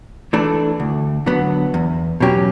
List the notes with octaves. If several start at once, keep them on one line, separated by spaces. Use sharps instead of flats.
E3 A3 D4 A4
D2
D3 F#3 B3
E2
B2 F#3 C#4 G4